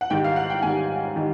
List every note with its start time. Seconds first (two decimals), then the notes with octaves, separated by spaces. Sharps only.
0.01 F#5
0.10 G#2 D#3 G3 G5
0.24 F5
0.36 F#5
0.50 G5
0.62 G#2 D#3 G3 G#5
1.16 D#3 G3